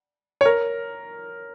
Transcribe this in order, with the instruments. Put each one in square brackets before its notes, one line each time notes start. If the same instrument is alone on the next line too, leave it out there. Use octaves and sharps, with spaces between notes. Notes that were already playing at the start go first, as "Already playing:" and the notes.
[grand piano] C#5
A#4